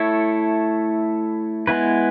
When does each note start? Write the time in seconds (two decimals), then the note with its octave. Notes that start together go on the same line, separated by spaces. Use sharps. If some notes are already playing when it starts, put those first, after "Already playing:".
Already playing: A3 E4 A4 C#5
1.67 G#3 B3 E4 B4